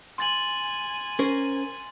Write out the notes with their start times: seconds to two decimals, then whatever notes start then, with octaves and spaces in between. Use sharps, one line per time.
0.18 G#5 C6 A6 F#7
1.19 C#4 A#4 C5